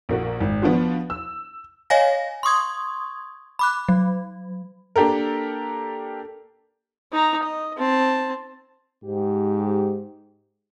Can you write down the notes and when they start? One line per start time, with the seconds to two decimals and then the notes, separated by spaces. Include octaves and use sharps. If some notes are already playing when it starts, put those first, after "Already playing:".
0.09 A#1 A#3 F#4
0.41 G#1
0.62 F3 B3 D4 F4 F#4
1.10 E6
1.90 C#5 D#5 F5 G#5 A#6
2.43 C6 C#6 D#6 G#6
3.59 B5 D6 F#6
3.89 F#3
4.96 A#3 D4 G4 A4 A#4
7.12 D#4 A#5
7.43 D#5
7.77 C4 A5
9.05 G#2 G4